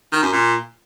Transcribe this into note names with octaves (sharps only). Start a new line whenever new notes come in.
D#3
F#2
A#2